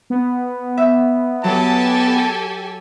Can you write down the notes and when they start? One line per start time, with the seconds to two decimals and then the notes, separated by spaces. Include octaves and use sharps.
0.10 B3
0.77 E5
1.44 F#3 G4 A4 G#5 A5